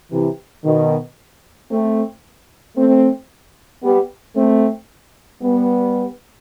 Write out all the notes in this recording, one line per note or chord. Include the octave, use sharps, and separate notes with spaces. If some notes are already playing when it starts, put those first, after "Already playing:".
C3 E3
B2 D#3
A3 C4
A3 C4
G3 B3
A3 C4
G3 B3